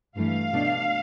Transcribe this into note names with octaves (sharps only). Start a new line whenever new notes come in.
G2 E3 A3 F5
B2 A3 D4